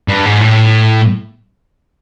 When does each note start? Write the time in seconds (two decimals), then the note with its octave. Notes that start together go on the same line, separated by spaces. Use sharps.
0.08 G2
0.25 G#2
0.41 A2